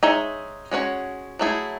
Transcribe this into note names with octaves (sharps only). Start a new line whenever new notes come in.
G#3 D#4 G#4 C#5 E5
G#3 C#4 F#4 C#5
F#3 A3 E4 G#4